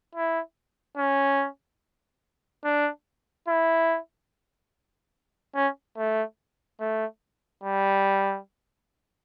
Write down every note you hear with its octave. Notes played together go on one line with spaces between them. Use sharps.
E4
C#4
D4
E4
C#4
A3
A3
G3